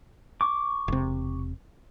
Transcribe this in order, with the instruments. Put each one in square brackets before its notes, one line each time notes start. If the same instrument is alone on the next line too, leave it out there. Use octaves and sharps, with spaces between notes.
[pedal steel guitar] C#6 D6
[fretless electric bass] E1 C3